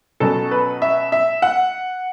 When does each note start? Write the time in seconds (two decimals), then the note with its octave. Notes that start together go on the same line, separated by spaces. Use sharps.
0.20 B2 F#3 C#4 A4
0.51 B4
0.82 E5
1.12 E5
1.42 F#5